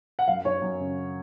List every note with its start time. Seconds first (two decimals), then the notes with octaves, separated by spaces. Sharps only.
0.19 F#5
0.28 F#2 F5
0.45 F#2 C#5
0.62 F#2
0.80 C#3